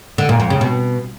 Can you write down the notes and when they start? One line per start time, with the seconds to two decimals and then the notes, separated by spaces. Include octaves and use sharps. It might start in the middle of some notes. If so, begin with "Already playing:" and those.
0.18 D3
0.29 A#2
0.40 F2
0.50 C#3
0.61 B2